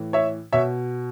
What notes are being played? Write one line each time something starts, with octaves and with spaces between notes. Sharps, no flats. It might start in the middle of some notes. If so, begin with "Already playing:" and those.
Already playing: A2 E3
C#5 E5
B2 C#5 E5